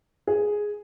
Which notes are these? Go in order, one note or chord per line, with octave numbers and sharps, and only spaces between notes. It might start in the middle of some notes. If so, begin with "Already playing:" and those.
G#4